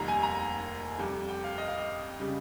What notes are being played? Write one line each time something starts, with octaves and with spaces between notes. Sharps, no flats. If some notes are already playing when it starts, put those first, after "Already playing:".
Already playing: F1 D#2 D#3 G3 A#5
G#5
A#5
F2 C3 G3
G5
F5
D#5
F5
D#5
C#3 G3